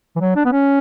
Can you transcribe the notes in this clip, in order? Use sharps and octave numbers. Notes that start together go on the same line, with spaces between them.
E3
F#3
D4
B3
C#4